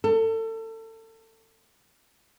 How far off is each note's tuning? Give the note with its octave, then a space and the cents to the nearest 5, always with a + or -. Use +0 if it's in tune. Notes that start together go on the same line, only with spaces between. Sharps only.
A4 +30